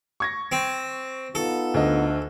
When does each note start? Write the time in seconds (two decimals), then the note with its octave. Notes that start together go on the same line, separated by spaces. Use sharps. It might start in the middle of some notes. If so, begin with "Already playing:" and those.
0.20 C#6 G#6 A#6
0.52 C4
1.35 B3 D#4 F4 A4
1.74 D2 D3 D#5